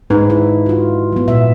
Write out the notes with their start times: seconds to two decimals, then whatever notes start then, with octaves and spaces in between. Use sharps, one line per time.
0.10 G#2 D4 D#4 B4
0.30 E4
0.66 F4 F#4
1.12 F#3 B3
1.28 A#2 E5